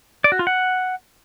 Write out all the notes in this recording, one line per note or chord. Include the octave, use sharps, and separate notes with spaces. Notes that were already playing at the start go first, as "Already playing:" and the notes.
D5
F#4
F4
F#5